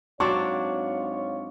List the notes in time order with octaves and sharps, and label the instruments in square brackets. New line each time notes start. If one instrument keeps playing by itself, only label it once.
[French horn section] G#2 F4 C#5 [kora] F#3 C4 D4 [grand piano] C#6